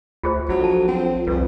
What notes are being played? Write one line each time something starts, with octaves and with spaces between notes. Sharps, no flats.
D2 F4 G#4 C5
A#1 F#3
F3 A4 A5
C4
C2 F2 B4